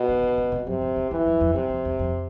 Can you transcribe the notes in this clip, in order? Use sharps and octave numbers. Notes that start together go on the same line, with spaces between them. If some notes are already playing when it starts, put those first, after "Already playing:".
Already playing: B2
D#3
D3
C#3
C3
F#2 C3
F2
E2
E2 E3
F2
F2
F2 C3
E2
E2
F2